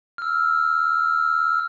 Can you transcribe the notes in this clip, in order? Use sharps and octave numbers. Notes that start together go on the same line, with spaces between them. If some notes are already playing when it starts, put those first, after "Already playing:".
E6 F6